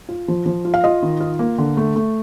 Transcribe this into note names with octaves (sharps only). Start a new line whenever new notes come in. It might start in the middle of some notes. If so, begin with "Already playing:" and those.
F4
F3
F3
F4
F5
F4 D#5
D#3
F4
A#3
D3
A3
A3